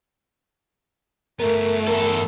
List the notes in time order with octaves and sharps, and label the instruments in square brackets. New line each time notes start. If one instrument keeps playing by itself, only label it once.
[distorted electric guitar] G2 B3 [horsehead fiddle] A3 [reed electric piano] A#4
[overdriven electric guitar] E2 A4 [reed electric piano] A#4